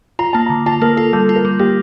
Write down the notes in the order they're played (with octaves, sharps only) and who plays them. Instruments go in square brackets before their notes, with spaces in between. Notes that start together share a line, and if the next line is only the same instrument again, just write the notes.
[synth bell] F4 [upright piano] A#5
[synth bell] A#3 [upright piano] A5
[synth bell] D3 [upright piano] A#5
[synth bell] F4 [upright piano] A5
[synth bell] A#3 [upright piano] A#4
[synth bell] F4 [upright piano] A4
[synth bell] G3 [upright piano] A4
[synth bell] F4
[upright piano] A#4
[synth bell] G3
[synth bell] A#3 [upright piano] G4